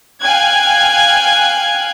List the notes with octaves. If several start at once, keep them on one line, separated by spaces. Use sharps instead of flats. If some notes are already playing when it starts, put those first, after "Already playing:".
F5 G5 G#5 F#6 G#6